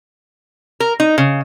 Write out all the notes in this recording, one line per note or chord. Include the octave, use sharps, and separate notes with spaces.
A#4
D#4
C#3